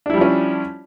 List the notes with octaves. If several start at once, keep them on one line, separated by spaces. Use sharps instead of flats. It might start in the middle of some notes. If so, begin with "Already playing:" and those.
F3 G3 C#4 D4 E4